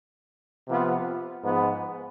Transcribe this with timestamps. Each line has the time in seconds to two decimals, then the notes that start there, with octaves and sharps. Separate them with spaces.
0.68 C3 F3 B3 F4
1.43 G#2 F3 G#3 B3